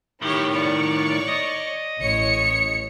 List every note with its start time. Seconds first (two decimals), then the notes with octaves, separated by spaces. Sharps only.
0.22 A2 D#3 E4 G4 C#5
0.52 C#5 D5 C#6
1.28 D#5
2.00 A1 C#5 C#7